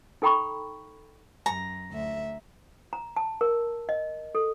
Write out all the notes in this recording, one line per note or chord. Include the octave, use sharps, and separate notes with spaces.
D#4 A4 G5 A#5 B5 C#6
F#2 A#5
D2 E5
A#5
A5
A#4
D#5
A4